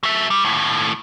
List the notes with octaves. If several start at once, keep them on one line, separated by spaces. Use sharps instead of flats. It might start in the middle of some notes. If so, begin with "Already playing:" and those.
F#3 E5
G3
D#2 A2